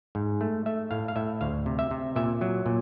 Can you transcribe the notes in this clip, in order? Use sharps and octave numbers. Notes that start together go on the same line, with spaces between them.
G#2
A3
A3 E5
A2 F5
F5
A2 E5
D2 F5
C3
E5
C3
A#2 E5
F#3
A#2